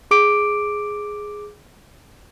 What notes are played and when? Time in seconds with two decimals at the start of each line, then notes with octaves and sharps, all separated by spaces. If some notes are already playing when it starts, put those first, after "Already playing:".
0.11 G#4 D6 D7